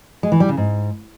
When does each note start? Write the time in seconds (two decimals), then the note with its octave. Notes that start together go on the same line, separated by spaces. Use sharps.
0.23 G#3
0.32 E3
0.40 G3
0.49 C#3
0.57 G#2